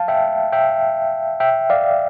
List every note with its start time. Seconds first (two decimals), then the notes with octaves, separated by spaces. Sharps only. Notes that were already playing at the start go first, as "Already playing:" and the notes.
Already playing: F5 A5
0.08 E5 G5
0.52 E5 G5
1.40 E5 G5
1.70 D5 F5